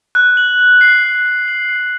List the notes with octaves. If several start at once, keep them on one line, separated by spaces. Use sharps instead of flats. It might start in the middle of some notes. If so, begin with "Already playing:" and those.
F#6
F#7
F#7
C7
F#6
F#6
F#7
C7